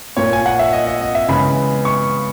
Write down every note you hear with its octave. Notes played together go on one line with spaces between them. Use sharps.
A#2 A#3 C#5
G#5
F#5
E5
D#5
D#5
D#5
E5
C#3 E3 G#3 B3 B5
C#6